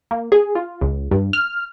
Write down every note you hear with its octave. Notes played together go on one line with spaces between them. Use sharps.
A#3
G#4
F4
C#2
G2
F6